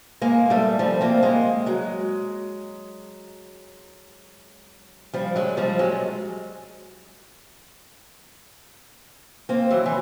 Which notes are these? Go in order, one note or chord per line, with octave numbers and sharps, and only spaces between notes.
G#3 A#3
G3 A3
F3 G3
A#3 C4
G#3 A#3
F#3 G#3
F3 G3
F#3 G#3
F3 G3
F#3 G#3
A#3 C4
E3 F#3
E3